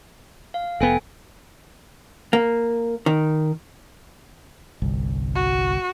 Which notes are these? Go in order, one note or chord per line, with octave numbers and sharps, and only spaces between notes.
F5
F1 B3 A4 G5 G#5
A#3
D#3
G1 C2
F#4